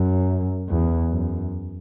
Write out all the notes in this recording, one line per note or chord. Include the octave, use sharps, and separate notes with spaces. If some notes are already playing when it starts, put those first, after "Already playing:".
Already playing: F#2
E2
F#2